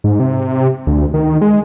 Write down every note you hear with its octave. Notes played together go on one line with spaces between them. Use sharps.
G#2
C3
D2
D#3
G#3